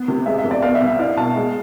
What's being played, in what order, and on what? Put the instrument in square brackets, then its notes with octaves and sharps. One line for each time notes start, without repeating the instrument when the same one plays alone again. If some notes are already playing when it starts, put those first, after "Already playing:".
Already playing: [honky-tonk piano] B3
C3
[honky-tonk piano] G#3 [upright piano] E5
[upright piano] E5
[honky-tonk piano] F2
[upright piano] D5
[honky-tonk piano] B3 [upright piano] D5 F5
[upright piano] E5
[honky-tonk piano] C2
[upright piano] E5
[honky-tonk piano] E4 [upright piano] D5 F5
[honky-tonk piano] B2 [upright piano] F5 A5
[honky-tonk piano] G#3